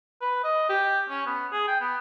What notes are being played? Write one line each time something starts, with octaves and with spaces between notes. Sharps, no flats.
B4
D#5
G4
C#4
B3
G#4
G5
B3